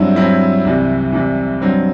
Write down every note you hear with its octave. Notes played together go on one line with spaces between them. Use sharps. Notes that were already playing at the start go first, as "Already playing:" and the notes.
Already playing: G2 F#3 C4 E4
G2 F#3 C4 E4
C2 C3 E3
C2 C3 E3
G2 F#3 C4